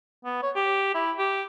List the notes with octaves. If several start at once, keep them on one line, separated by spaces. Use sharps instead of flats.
B3
C#5
G4
E4
G4